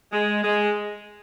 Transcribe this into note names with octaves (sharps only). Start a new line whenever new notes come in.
G#3
G#3